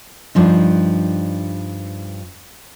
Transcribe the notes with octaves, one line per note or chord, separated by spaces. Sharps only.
G2 F3 D#4